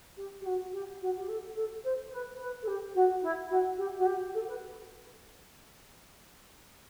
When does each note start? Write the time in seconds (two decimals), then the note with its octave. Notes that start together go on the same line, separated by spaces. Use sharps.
0.17 G4
0.41 G4
0.45 F#4
0.73 G4
1.01 F#4
1.17 G4
1.28 A4
1.56 A4
1.84 C5
2.12 B4
2.40 B4
2.62 A4
2.67 G4
2.95 F#4
3.22 E4
3.50 F#4
3.78 G4
3.98 F#4
4.06 G4
4.34 A4
4.47 B4